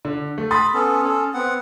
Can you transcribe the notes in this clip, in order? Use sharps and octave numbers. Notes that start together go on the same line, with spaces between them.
D3
A3
B5 C6 D#6 A6
B3 C#4 A4
C#4 A4
B3 C4 F#5